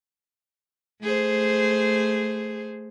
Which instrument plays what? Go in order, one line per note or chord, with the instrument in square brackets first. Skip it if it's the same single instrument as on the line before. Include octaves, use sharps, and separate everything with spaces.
[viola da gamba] A3 G#4 C5